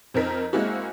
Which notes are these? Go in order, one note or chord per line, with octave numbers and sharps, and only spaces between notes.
F2 C4 D#4 A#4 B6
G#3 A#3 C4 E4 F#4